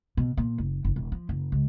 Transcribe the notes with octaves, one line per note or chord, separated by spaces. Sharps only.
B2
A#2
F#1
F#1
E1
F3
F#1
C#2